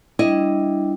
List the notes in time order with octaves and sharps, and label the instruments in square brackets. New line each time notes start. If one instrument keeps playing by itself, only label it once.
[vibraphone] G3 D4 [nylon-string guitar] E4 D#5